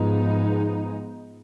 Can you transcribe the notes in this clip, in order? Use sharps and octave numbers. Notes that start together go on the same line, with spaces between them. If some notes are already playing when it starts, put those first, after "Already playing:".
Already playing: G#2 F3 G#3 B3 D#4